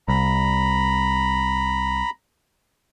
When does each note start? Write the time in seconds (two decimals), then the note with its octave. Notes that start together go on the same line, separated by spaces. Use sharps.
0.08 C2 A#5 B5